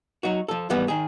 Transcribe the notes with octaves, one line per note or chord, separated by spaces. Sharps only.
F#3 D#4 F#4
F3 A4
G#2 E3 G3 B3
D#3 G#4